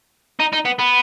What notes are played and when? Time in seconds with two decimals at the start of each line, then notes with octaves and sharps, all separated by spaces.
0.40 D#4
0.53 D#4
0.66 B3
0.79 B3